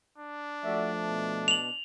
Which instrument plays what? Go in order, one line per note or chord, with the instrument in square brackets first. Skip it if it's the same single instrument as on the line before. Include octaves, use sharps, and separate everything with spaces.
[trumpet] D4
[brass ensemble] F3 A3 [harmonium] F#4 D5 E5
[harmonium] B2
[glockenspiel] F7 F#7